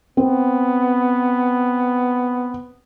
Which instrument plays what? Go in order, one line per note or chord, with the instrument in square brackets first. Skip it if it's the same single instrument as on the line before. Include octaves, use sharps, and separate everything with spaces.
[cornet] B3 [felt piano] C4